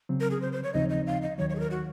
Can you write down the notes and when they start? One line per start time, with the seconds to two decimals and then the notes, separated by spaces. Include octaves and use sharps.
0.09 C#3 F#3 C4
0.20 A#4
0.31 G#4
0.41 C5
0.53 C5
0.63 C#5
0.73 D#2 C#3 F3 C4 D#4 D#5
0.90 D#5
1.06 F5
1.22 D#5
1.38 D#2 D#3 F#3 C#5
1.50 C#5
1.55 G#4
1.60 A#4
1.71 F#4